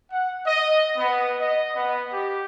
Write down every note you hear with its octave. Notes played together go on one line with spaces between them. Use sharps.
F#5
D#5
B3
D#5
B3
G4